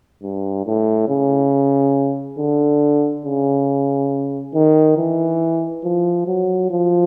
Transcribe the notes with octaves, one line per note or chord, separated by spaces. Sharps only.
G2
A2
C#3
D3
C#3
D#3
E3
F3
F#3
F3